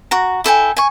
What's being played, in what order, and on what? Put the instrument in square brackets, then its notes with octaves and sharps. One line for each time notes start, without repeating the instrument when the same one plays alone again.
[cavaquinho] F#4 A#5
E4 A4 G5 G#5
G#5 C#6